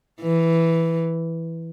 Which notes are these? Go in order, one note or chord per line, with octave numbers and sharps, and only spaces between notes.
E3